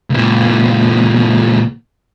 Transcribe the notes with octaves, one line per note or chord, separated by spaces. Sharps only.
C#2 A#2